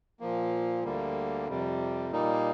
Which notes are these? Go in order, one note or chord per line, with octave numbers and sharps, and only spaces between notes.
A#2 F3 A#3
D2 D3 G3 A#3
F2 C3 G3
A#2 G3 A#3 D#4